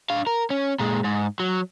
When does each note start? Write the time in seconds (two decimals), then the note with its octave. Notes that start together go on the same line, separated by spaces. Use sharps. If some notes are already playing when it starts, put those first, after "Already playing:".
0.10 D4 F5
0.27 A#4
0.50 C#4
0.80 A#2 G#3
1.04 G#2
1.40 F#3